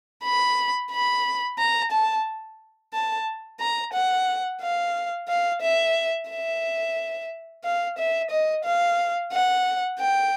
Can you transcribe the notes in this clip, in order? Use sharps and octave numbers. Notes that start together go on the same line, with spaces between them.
B5
B5
A#5
A5
A5
A#5
F#5
F5
F5
E5
E5
F5
E5
D#5
F5
F#5
G5